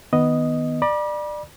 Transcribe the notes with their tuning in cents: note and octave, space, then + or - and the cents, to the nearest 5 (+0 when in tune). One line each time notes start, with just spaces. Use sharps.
D#3 +0 B3 +0 D#5 +0
D5 +25 B5 -40